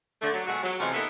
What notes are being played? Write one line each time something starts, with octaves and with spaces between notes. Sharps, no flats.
D3 A3
F#3
B2 G#3 A3 F#4
F#3
C3 E3 F3 G#3 A3 C#4
A#3 B3 D#4 A4 B4 E5